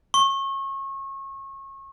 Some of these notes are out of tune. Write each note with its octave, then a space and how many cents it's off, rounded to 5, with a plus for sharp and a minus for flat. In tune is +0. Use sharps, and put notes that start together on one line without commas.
C#6 -30